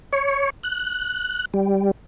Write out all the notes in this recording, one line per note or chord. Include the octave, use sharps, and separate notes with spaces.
C#5
F#6
G3